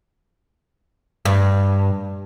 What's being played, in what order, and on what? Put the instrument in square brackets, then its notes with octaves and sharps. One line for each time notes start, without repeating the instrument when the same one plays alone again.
[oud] G2